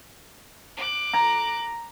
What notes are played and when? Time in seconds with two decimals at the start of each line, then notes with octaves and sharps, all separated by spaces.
0.77 D6 F#6
1.13 A#5